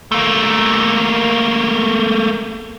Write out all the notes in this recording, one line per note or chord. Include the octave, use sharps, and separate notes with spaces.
A3 A#3